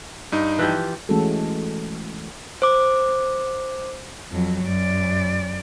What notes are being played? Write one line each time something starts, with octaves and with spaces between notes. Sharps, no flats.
G2 D#4
E3 F3 G4
E3 G#3 A3 C#4 F#4 A4
C5 D6
F2 F#3
F#2 D5